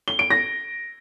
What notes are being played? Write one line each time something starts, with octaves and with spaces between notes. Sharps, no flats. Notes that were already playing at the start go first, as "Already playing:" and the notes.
G7
D7
A#6